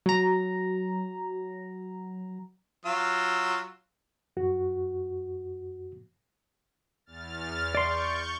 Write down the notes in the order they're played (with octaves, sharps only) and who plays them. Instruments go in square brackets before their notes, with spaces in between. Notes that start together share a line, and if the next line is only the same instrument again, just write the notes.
[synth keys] F#3 A#5
[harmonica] F#3 F4 E6
[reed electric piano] F#2 F#4
[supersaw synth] E2 F6 A6
[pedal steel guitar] D5 C6 [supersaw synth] C#6 G6